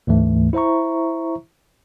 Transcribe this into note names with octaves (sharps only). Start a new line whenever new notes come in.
D2 G#2 E3 A3
E4 C5 E5 A#5 C#6